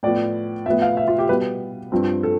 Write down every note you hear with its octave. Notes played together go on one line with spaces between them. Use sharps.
A2 F3 B3 D5
A2 F3 B3 E5
F5
E5
F4
G4
B2 G3 B3 B4
G2 F3 C4
A4